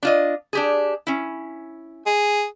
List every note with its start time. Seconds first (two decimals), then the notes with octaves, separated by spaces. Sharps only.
0.03 D4 F4 D#5
0.53 D4 G4 G#4
1.07 C#4 E4
2.06 G#4